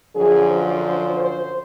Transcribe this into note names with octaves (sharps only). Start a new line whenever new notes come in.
F#2 D3 F3 G#4
C5
C5